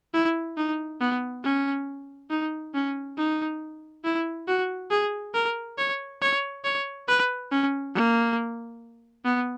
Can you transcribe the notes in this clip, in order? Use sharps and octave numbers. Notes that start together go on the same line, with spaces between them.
E4
D#4
B3
C#4
D#4
C#4
D#4
E4
F#4
G#4
A#4
C#5
C#5
C#5
B4
C#4
A#3
B3